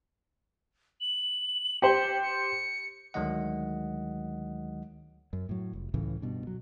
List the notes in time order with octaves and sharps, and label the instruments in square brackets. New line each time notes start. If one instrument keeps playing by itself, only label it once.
[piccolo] F#7
[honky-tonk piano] G4 C5 [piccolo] C#7
[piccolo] C#7
[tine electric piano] D2 D#3 F#3 G#3 D#5 F#5
[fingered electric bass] F#2
A2 F#3
F1
C#2 A2 C#3 E3
G2 B2
F#3